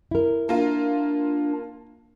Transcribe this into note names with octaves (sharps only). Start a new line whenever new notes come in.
E4 A#4
A#3 D4 F4